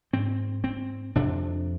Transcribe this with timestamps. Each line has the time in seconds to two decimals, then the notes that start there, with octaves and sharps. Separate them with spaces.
0.13 G#2 C4
0.64 C4
1.15 F2 C3 D4